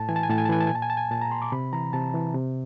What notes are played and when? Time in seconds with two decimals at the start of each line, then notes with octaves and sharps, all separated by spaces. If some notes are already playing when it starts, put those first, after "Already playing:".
Already playing: A2 A5
0.09 E3 G#5
0.16 A5
0.23 G#5
0.29 A2 A5
0.38 G#5
0.45 A5
0.50 E3 G#5
0.61 A5
0.67 A#2 G#5
0.75 A5
0.82 G#5
0.90 A5
0.97 G#5
1.11 A#2 A5
1.21 A#5
1.31 C6
1.42 D6
1.52 C3 B5
1.73 E3 A#5
1.93 C3 A5
2.14 E3
2.34 C3